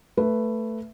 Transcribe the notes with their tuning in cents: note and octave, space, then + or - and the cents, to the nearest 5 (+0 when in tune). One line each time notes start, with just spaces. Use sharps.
A3 +15 B4 +0